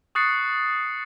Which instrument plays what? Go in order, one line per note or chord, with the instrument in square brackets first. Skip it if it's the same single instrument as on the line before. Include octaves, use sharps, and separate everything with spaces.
[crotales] C#6 D#6 F#6 A6 C7 C#7